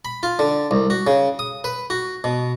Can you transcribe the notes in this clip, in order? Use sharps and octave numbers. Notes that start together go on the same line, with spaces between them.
B5
F4
D3
C2
F#4
C#3
D#6
B4
F#4
B2